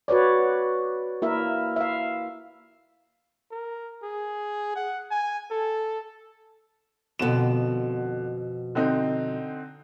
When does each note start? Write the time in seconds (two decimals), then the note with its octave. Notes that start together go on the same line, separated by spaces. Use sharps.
0.08 F#4 B4 C#5 D5
1.22 A#3 E4 A#4 E5
1.76 E5 F5
3.51 A#4
4.03 G#4
4.76 F#5
5.11 G#5
5.51 A4
7.19 F2 B2 D3 E7
8.75 D3 C4 D#4